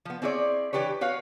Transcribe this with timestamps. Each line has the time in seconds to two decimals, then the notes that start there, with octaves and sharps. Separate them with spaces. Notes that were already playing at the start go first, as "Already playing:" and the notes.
0.05 F3 B3
0.22 C4 D4 E4 G#4 C#5 D5
0.73 E3 D4 G4 B4 C#5
1.01 F#4 B4 C#5 F5